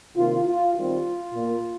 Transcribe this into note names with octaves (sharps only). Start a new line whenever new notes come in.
C3 D#3 A#3 F4
F4
D#3 G3 C4 F4
A#2 A#3